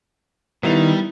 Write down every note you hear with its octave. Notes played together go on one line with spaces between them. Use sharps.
D#3 G3 B3 E4 F7